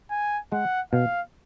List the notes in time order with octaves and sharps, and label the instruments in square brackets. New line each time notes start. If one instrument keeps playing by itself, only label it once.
[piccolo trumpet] G#5
[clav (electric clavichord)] G#3 [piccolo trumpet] F#5
[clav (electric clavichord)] B2 [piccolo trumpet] F5